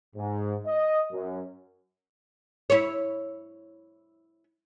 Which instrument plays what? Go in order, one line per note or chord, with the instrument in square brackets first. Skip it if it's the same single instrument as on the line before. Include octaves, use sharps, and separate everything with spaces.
[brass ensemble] G#2
D#5
F#2
[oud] E4 C#5